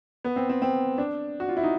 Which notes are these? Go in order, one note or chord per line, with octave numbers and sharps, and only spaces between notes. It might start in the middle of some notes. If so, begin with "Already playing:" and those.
B3
C4
C4
C4
D4
F#4
F4
E4
D#4